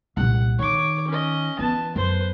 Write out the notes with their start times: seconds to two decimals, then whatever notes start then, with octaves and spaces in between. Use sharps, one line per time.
0.17 C2 A#2 F#5
0.59 D#3 C#5 D6
1.08 C#4 D#5
1.59 E3 B3 A5
1.96 F#2 B4 C5